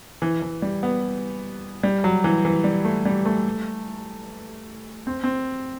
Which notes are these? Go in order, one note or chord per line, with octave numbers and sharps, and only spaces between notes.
E3
E3
G3
B3
G3
F#3
E3
E3
G3
A3
G3
A3
C4
C4